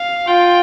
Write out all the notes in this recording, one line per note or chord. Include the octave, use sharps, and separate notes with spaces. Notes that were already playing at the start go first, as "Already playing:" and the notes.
Already playing: F5
F4 G5